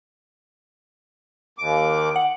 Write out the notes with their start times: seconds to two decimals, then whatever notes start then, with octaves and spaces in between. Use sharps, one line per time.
1.59 D#2 D6
2.16 F#5